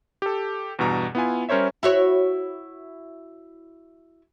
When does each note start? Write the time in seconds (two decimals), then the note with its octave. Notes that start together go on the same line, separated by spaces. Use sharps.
0.22 G4 A4
0.79 E2 G2 B2 A#5
1.15 B3 E4 F4 G#5
1.49 G3 C#4 A#4 C5 C#5 E5
1.83 E4 F#4 C#5